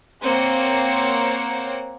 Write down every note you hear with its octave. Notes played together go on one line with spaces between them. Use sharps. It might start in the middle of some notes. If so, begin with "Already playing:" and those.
A#3 C4 C5 C#5 F#5 C#7